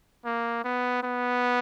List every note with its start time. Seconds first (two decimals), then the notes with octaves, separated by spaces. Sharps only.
0.25 A#3
0.64 B3
1.03 B3